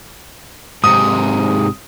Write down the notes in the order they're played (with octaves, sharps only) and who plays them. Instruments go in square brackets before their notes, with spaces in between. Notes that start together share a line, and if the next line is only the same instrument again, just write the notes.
[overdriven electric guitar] G#2 C3 [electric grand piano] D#6